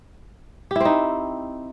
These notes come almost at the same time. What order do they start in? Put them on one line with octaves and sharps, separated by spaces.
G4 E4 C4 D#4